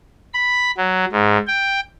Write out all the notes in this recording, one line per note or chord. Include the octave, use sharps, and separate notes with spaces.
B5
F#3
G#2
G5